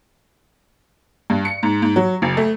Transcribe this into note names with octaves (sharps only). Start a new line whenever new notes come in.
G2
C#7
G#2
G#2
F#3
F#1
A3